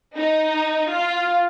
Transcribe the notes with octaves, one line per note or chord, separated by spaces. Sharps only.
D#4
F4